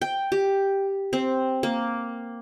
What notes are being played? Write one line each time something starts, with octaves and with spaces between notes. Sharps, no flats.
G5
G4
C4
A#3